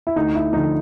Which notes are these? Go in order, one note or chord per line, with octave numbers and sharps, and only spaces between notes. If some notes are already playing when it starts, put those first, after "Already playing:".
E4
D2 D#4
E4
D3 F3 D#4